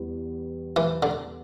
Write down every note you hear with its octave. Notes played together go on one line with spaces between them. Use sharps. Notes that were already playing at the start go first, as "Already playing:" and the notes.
Already playing: E2 G3
E3
D3